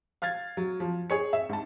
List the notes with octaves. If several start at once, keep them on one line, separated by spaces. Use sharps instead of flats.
F5 F6 G#6 A6
F#3
F3
G#4 C#5 C#7
E5
G#2 A5